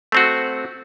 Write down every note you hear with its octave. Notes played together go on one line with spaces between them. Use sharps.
A3 C4 F#4